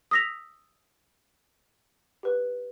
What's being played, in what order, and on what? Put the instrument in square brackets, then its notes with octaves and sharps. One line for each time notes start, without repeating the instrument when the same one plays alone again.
[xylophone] D#6 E6 A#6 B6 F7
G4 B4